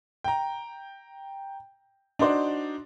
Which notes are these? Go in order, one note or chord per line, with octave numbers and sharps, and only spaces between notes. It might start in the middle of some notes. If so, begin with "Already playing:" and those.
G5 A#5
D4 D#4 F#4 C5 D5